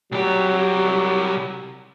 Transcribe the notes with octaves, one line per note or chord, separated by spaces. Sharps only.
C2 F#3 G4